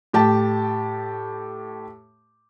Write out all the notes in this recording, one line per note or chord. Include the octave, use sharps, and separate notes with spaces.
A2 G4 A5